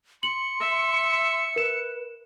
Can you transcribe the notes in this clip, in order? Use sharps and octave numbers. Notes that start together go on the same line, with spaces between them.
C6 C#7 F#7
E5
A#4 B4 E7